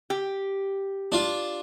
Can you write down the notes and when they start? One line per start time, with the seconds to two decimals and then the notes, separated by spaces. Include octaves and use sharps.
0.10 G4
1.12 D4 F4